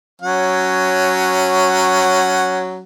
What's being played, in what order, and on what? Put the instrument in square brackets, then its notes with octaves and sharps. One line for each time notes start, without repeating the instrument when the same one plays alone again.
[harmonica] F#3 C#4 F#5